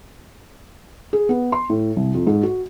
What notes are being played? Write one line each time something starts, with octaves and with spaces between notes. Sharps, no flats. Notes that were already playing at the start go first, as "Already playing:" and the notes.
G#4
B3
C6
A2
C2
F2
G#2
F#4